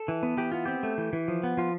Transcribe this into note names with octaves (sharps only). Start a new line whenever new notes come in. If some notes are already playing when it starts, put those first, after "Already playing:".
Already playing: A4
E3
B3
E3 G4
B3 F4
C4 G4
A3
E3
E3
F3
B3
F3 F4